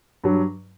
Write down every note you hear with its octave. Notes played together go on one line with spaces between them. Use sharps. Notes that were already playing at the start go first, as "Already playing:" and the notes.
G2 F#3